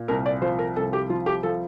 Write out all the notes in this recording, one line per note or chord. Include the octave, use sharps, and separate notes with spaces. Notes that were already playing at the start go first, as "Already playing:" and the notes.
Already playing: A#2
C2 A#4
D5
F3 C5
A#4
C2 A4
G4
F3 F4
G4
F3 A4